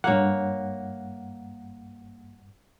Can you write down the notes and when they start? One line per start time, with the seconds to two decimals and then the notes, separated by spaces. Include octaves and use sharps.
0.04 G2 A#3 C#5 F#5